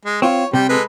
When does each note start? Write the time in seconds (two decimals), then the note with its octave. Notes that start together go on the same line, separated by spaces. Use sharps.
0.05 G#3
0.22 C4 F4 C#5
0.53 C3 G3 G5
0.69 G#3 A4 B4